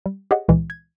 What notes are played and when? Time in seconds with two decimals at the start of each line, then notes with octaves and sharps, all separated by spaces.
0.06 G3
0.31 G4 G#4 C#5 D#5 F#5
0.48 C#2 A#2 E3 G#3
0.70 G#6